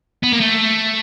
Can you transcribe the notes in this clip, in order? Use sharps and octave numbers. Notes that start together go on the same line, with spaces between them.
B3
A#3
A3